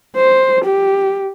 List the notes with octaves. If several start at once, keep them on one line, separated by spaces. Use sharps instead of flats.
C5
G4